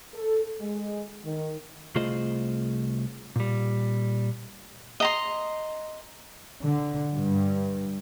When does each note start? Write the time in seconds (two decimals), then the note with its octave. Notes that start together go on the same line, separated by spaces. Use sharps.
0.14 A4
0.59 G#3
1.24 D#3
1.95 C2 A3 F4 G#4 C5 D#5
3.36 A#2 G3
5.00 D#5 A#5 C6
6.62 D3
7.14 G2